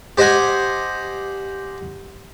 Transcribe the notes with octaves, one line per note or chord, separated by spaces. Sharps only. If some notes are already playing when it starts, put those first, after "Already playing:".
G4 C5 D#5 F#5 G#5